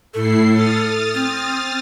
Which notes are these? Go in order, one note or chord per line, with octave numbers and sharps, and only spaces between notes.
A2 E4 A4 C7
D#6 F6 A6
C4